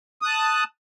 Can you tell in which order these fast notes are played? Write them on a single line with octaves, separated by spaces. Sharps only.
D#6 F#6 A5